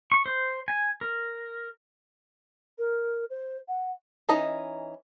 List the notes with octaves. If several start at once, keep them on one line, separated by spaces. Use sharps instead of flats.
C#6
C5
G#5
A#4
A#4
C5
F#5
E3 C#4 D#4 D#5 A#5